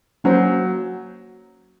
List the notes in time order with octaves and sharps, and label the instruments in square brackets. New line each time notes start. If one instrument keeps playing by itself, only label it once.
[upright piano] F#3 [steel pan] A#3 C#4 F#4 C5